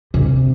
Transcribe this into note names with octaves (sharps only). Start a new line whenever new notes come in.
C3